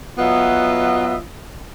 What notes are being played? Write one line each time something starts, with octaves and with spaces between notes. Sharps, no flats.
F#3 B3 F4 D#5 E5